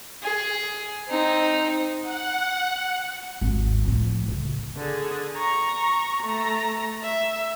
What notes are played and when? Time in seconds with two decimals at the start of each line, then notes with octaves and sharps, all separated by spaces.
0.23 G#4
1.08 C4 D#4
2.02 F#5
3.41 G#1 D#2
3.85 A2 F3
4.28 A2 C#3
4.77 D3 G#4
5.36 A#5 C#6
6.23 A3 A#5
7.03 E5